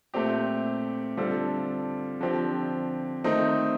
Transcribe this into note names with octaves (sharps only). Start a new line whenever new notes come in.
A#2 A3 C4 G4
D3 G3 C4 F4 A4
D3 F3 C4 G4
D#3 A3 C4 D#4